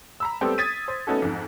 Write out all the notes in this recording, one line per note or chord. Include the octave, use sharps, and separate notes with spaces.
A#5 B5 E6
G3 A3 B3 C4 G4 A4
D#6 G#6 A6 B6 D#7
C5
A3 B3 C#4 D#4 F#4 A4
F2 G#2